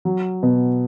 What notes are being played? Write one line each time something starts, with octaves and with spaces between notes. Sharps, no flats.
F#3
B2